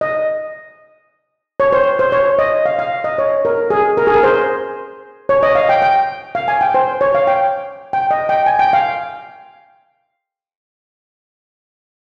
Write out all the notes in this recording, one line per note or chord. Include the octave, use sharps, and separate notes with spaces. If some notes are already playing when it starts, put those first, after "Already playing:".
D#5
C#5
C5
C5
C#5
D#5
F5
F5
D#5
C#5
A#4
G#4
A#4
G#4
A#4
C5
C#5
D#5
F5
G5
G5
F5
G#5
G5
C5
C#5
F5
G5
G5
D#5
G5
G#5
G5
F5